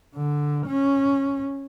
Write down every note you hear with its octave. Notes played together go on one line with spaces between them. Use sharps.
D3
C#4